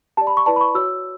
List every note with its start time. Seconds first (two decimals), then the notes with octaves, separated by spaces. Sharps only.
0.17 G4 D5 A5
0.27 B5
0.37 C#6
0.46 E4 B4 D5 A5
0.56 B5
0.61 C#6
0.75 F#4 C#5 E6